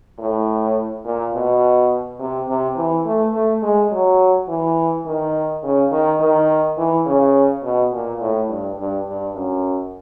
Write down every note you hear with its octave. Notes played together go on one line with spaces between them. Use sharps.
A2
A#2
B2
C3
C3
E3
A3
A3
G#3
F#3
E3
D#3
C#3
D#3
D#3
E3
C#3
B2
A#2
A2
G2
G2
G2
F#2